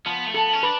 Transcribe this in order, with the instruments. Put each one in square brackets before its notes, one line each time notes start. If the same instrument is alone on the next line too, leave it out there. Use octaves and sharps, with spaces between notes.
[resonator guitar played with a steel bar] F3 [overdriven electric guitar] B3
[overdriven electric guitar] A3
[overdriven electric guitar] B3 [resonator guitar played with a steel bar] A4
[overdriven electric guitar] C#4
[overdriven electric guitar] D4 [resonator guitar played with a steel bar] B4